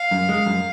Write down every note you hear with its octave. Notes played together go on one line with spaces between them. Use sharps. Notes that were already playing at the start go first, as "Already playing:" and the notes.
Already playing: F5
F#2
G#3
F#2